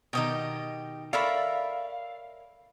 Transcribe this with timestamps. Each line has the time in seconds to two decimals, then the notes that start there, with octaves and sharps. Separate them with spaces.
0.13 B2 D#3 G4 D#5 G5
1.13 A4 A#4 C#5 D5 E5 F5 B5